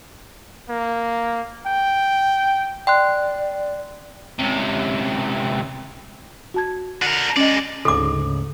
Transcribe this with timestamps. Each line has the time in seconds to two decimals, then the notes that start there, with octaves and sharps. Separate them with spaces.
0.69 A#3
1.66 G5
2.87 D5 G5 C6 F#6
4.39 C#2 C3
6.54 F#4 A5 G#6
7.02 D3 A#4
7.37 G#3 C#4 D5 D#5
7.85 D2 G#2 C#3 A4 D6